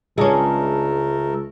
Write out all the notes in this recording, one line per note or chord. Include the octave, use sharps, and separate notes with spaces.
C#2 G#3 A3 C#4 D4 A4 A#4